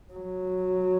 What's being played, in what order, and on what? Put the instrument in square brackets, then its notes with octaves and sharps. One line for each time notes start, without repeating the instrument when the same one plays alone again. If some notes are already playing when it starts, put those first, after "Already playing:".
[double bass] F#3